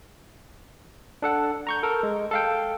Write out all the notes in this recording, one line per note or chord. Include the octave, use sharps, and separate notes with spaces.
D4 A4 F#5
A#5 C#6 G6
A4 A#4
G#3
A4 F5 G5